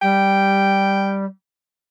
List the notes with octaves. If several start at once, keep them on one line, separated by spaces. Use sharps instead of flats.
G3 G5